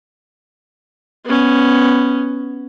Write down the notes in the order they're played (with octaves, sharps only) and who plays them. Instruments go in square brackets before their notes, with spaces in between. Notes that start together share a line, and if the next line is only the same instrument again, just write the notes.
[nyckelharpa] B3 C#4